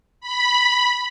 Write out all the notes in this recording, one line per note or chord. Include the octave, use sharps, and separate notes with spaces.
B5